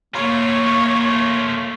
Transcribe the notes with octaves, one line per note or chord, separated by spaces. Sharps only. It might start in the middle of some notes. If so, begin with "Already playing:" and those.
A3 A#3 F4 C#5